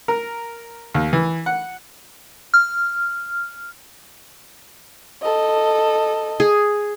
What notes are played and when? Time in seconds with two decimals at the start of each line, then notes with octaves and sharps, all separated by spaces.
0.08 A#4
0.94 D#2
1.13 E3
1.46 F#5
2.54 F6
5.22 A4 D#5
6.40 G#4